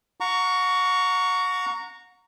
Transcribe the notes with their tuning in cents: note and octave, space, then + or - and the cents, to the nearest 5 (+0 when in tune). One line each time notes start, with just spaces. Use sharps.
F#5 -30 A#5 -10 C#6 +20